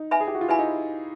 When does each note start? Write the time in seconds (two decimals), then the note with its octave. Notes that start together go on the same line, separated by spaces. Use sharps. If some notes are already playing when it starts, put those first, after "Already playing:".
Already playing: D#4
0.11 B4 E5 G#5 B5
0.21 G#4
0.28 G4
0.35 F#4
0.41 F4
0.49 E4 B4 E5 G#5 B5
0.59 D#4